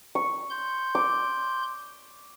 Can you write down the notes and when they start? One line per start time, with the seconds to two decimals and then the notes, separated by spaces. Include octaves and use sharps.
0.15 C#6
0.50 C6 G6
0.95 D6